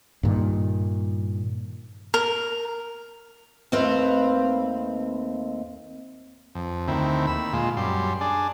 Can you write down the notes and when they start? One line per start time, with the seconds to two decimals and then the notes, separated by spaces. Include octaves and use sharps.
0.23 G2 A#2 D#3
2.14 A#4
3.72 D#2 A3 C4 B4 F5
6.55 F2
6.88 D2 D#3 C4 E4
7.27 D#2 B5 E6
7.53 A#2 G#3 F4
7.77 F#2 G3 C6
8.21 D4 G#4 D5